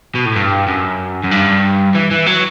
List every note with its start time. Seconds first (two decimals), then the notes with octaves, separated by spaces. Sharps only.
0.15 B2
0.25 A2
0.36 G2
0.68 F#2
1.23 F#2
1.31 G2
1.95 E3
2.11 E3
2.26 F#3